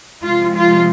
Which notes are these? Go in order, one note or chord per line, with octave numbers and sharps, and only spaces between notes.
C3 F3 G#3 F4
F4